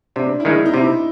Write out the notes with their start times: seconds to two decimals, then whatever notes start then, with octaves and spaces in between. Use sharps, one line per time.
0.16 C3 D4
0.40 E4
0.45 D#3 G#3 D#4
0.66 D#4
0.73 C3 E4